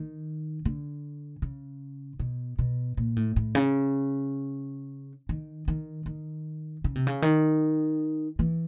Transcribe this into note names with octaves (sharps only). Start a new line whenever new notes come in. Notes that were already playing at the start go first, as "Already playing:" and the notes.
Already playing: D#3
D3
C#3
B2
B2
A#2
A2
A2
C#3
D#3
D#3
D#3
C#3
C3
C#3
D#3
E3